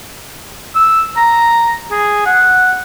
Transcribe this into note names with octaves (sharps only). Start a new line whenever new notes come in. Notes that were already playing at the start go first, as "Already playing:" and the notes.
E6
A#5
G#4
F#5